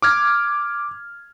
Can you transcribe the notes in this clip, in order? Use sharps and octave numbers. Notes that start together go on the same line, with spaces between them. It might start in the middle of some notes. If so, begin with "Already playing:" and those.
D6 F6 G#6